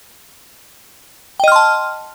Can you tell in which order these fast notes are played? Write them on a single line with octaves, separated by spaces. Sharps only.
G5 D#5 F6 C6 A5